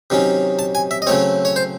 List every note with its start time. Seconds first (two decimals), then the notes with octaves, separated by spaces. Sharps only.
0.10 C3 D#3 F#3 C#4
0.59 A5
0.75 G#5
0.91 E5
1.02 D#5
1.07 C#3 F#3 A3 C4 C#5
1.45 C#5
1.56 C5